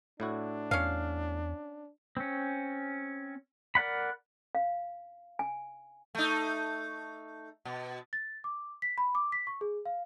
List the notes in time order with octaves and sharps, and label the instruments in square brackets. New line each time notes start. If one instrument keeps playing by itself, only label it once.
[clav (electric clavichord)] A2 E4 F#4 [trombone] D4
[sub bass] E2 [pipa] C#4 F5
[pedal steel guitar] C4 C#4
A#4 D5 F#5 B5
[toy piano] F5
G#5
[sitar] A3 D#4
B2
[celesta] A6
D6
B6
B5
D6
B6
C#6
G#4
F5